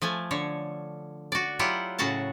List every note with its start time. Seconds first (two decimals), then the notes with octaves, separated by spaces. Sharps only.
0.02 F3 A3 G#5
0.31 D3 C#5
1.32 F#4 D5
1.59 F#3 E4 F4 G4 F#5
1.98 A2 C#3 F#4 F#5 A5